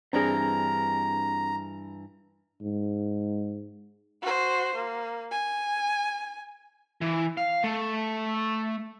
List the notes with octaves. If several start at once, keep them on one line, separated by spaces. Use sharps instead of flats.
G2 E3 C4 D4 G#4 A#4 A#5
G#2
F#4 C5
A#3
G#5
E3
F5
A3